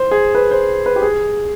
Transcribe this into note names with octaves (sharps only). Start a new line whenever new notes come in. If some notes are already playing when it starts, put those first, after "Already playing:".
Already playing: C5
G#4
B4
C5
B4
G4
G#4